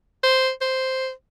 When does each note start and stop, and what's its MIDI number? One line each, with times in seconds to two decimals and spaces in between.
0.23 0.50 72
0.61 1.11 72